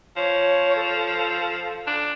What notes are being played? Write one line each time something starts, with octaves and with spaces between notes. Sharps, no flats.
F3 C#5
A4
D4